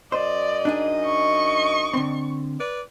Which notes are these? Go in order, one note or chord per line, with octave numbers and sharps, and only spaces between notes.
F#2 C5 D5 D#5
D4 D#4 G#4
C#6
D3 C4
B4 D5